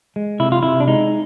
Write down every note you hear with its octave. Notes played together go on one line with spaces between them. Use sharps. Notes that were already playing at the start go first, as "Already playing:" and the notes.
G#3
C3 E4
F4
C3 E4
D4
G#3 D#4